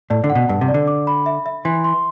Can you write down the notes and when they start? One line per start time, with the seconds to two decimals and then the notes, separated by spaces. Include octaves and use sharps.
0.10 A2 D5
0.24 D3
0.30 F#5
0.35 B2
0.49 G2 A5
0.61 C3
0.68 D5
0.74 D3
0.87 D6
1.07 B5
1.26 E5
1.46 E5
1.65 E3 C6
1.84 C6